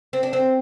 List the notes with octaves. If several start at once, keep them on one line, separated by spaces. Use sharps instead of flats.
C4
D4
C4